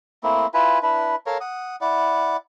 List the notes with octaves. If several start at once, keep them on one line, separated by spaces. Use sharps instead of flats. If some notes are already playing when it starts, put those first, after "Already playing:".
A3 A#3 C4 E4
E4 F4 B4 G#5
D4 E4 B4
A4 A#4 C#5 F5
F#5 D#6
E4 D5 F#5